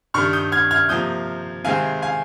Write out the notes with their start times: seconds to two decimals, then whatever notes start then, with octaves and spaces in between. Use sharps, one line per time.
0.14 G2 D#3 G3 C#6 F6
0.33 D#6 G6
0.52 F6 G#6
0.71 F6 G#6
0.89 C3 F3 A#3 D#6 G6
1.64 C3 D#3 G#3 C4 F5 G#5
2.02 F5 G#5